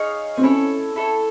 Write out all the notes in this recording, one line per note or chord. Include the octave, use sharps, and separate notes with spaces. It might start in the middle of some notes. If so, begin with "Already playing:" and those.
Already playing: D#4 G#4 C#5 F5
C4
C#4 E4 A4 C#5
E4 A4 C#5